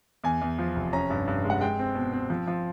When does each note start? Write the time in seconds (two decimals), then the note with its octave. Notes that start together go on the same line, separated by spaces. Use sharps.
0.24 E2 G#5
0.41 E2
0.59 F3
0.76 F1
0.93 C#4 A#5
1.10 G2
1.27 G2
1.44 G#3
1.50 F#5
1.61 G#3 G5
1.79 C4
1.95 B2
2.13 C4
2.30 F3
2.48 F3